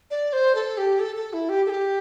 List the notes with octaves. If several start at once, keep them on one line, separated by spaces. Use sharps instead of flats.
D5
C5
A4
G4
A4
A4
E4
G4
A4
G4